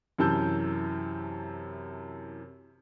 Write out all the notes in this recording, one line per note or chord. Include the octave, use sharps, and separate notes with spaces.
F#2 C3 E3 A5 E6 G6